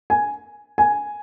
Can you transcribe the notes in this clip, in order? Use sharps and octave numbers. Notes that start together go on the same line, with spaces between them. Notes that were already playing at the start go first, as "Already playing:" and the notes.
G#5
G#5